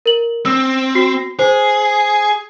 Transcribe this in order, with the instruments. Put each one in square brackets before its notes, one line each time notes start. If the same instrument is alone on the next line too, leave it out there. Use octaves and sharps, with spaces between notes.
[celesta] A#4 F#7
[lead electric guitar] C4 [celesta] E6
[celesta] F#4 C7
[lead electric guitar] G#4 [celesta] C5